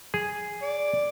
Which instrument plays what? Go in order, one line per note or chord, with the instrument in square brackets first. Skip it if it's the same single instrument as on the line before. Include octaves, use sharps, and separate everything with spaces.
[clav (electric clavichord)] G#4
[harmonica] D5